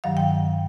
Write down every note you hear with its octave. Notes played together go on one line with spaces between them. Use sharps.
G2 D#3 F#3 F5
G5